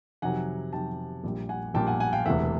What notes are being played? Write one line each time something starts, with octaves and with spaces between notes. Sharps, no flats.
F2 C3 D#3 F#3 F#5 G#5
F2 C3 D#3 F#3 G5 A5
A#1 A#2 G3
F#5 G#5
A#1 A#2 G3 G5 A5
F#5 G#5
F#5 G#5
F5 G5
E1 D2 C3 E3 A3 E5 F#5